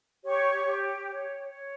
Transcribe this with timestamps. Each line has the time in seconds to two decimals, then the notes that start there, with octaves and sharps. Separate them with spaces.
0.24 G4 C#5 C#6
0.66 G4
1.09 C#5
1.51 C#5